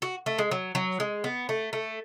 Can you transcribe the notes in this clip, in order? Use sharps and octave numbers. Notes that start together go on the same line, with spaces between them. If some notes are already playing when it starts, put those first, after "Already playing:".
F#4
A3
G#3
F#3
F#3
G#3
B3
A3
A3